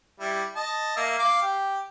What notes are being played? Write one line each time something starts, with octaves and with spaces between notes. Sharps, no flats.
G3 E4
D#5 A5
A#3 E5
F5 D6
G4